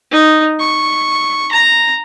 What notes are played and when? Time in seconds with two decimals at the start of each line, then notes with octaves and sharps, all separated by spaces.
0.11 D#4
0.60 C#6
1.52 A#5